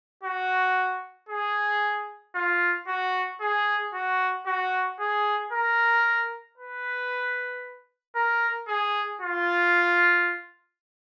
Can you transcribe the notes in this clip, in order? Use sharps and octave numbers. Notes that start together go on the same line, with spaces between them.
F#4
G#4
F4
F#4
G#4
F#4
F#4
G#4
A#4
B4
A#4
G#4
F4